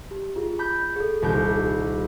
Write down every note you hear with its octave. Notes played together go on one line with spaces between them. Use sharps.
G4
F4 G#4
B5 G6
G#4 A4
D#1 C2 G6